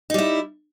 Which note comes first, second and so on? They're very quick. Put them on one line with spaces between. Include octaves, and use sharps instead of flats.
D#4 G3 E4